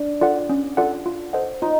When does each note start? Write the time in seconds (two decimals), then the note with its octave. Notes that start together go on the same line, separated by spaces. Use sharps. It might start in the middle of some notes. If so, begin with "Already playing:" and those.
Already playing: D4
0.21 F4 A4 D5 F#5
0.49 C#4
0.77 F4 A4 D5 F#5
1.06 F4
1.33 A4 C5 D#5 F#5
1.62 D#4 F4